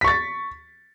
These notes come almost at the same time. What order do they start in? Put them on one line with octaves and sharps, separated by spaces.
B6 C#6 A6